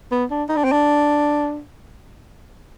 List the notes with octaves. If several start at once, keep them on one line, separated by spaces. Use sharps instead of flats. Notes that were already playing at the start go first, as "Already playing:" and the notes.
B3
D4
D#4
D4
C4
D4